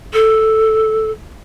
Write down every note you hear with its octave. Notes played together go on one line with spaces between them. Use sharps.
A4